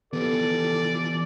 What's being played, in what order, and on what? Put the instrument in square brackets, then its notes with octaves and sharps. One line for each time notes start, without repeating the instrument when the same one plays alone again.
[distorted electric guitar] E3 F3 [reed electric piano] B3 [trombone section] G4 A4 [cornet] D5